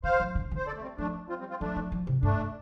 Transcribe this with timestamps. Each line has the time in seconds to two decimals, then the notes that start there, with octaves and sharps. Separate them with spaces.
0.04 D3 C5 F5
0.20 F3
0.35 D3
0.51 D3 C5
0.67 A4 D5
0.76 A3
0.82 G3 C4
0.98 F3 A3 D4
1.29 C4 F4
1.40 G3 C4
1.50 C4 F4
1.61 F3 A3 D4
1.76 F3
1.92 F3
2.07 C3
2.23 G2 A3 D4